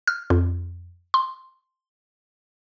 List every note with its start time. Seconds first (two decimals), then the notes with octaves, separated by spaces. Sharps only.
0.08 F6
0.30 F2
1.14 C6